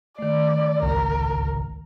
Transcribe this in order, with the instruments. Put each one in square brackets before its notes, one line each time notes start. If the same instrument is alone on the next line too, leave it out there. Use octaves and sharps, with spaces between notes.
[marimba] D#3 A3 [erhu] D5
[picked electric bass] D1 G#1 C#2 [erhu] A#4